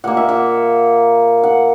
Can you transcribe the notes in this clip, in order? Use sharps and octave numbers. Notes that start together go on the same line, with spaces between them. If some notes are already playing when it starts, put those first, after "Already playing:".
A#2 A#3 F#5
E5
F#5
F#5